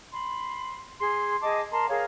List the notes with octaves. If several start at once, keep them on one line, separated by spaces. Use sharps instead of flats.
B5 C6
G#4 C6
G#4 D#5 A5 D6
A#4 A5 A#5 C6
G#4 A#4 C#5 F5